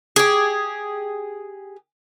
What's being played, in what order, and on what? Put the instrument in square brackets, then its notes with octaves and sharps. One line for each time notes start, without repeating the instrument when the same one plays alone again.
[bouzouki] G4 G#4